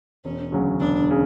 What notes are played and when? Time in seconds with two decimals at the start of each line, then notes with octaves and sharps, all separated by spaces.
0.25 E1 C#4
0.52 D2 C#3 F#3
0.80 E1 D4
1.11 C#3